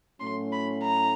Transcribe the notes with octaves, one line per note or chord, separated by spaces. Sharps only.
A2 F#3 A3 C#4 C6
B5
A#5